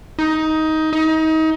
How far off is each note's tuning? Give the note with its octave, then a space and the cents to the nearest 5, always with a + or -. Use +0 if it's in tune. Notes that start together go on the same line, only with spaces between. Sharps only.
D#4 +15
D#4 +30